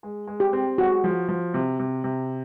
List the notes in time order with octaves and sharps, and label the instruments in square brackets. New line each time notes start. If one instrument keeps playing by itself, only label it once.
[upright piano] G#3
G#3
[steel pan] G4
[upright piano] C4
[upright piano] G#3 [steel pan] F#4
[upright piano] F3
F3
C3
C3
C3